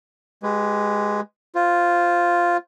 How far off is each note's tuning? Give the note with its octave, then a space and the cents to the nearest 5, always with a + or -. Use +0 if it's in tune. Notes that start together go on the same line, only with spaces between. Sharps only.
G#3 +0 G4 -25 B4 +0
F4 +0 C5 +0